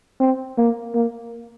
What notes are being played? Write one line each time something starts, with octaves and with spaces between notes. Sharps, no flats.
C4
A#3
A#3